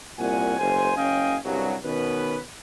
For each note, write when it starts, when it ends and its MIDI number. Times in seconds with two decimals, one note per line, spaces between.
0.19 0.56 36
0.19 0.56 46
0.19 0.56 61
0.19 0.56 78
0.19 0.56 80
0.59 0.93 30
0.59 0.93 72
0.59 0.93 80
0.97 1.37 30
0.97 1.37 61
0.97 1.37 75
0.97 1.37 77
0.97 1.37 79
0.97 1.37 80
1.45 1.75 36
1.45 1.75 43
1.45 1.75 49
1.45 1.75 54
1.85 2.40 47
1.85 2.40 51
1.85 2.40 59
1.85 2.40 61
1.85 2.40 71